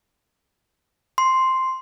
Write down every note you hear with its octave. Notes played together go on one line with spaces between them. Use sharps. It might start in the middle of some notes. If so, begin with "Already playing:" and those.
C6